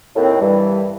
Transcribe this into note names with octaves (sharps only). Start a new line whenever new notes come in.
D#2 A2 C4
G2 E3 G3